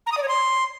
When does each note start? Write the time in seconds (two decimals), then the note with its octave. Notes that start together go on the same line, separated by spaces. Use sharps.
0.06 A#5
0.12 D#6
0.17 D5
0.23 C#5
0.28 C6